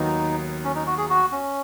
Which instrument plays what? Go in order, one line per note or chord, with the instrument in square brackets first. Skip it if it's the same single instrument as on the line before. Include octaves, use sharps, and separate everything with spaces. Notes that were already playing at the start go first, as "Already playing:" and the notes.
Already playing: [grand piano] D#2 D#3 F#3 B3 [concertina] D#4
[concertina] C#4
D#4
F#4
G#4
F#4
C#4